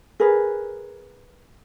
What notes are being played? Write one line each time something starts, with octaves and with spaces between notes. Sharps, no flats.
G#4 A#4 B4